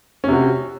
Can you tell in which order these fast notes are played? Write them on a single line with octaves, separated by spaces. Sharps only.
C#4 C3 F#4